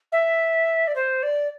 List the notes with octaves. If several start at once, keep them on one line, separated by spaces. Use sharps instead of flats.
E5
D5
C5
D5